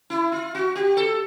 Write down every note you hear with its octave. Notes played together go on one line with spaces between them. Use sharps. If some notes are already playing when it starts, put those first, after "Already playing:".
E4
F4
F#4
G4
A4